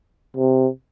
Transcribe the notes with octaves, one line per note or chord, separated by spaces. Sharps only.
C3